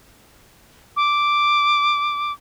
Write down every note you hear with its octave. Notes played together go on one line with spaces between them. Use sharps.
D6